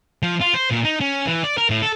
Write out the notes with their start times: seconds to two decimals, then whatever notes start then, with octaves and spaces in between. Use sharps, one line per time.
0.23 F3
0.41 F4
0.54 C5
0.71 A#2
0.84 D#4
1.01 C#4
1.26 E3
1.44 D5
1.58 A#4
1.70 A2
1.82 A4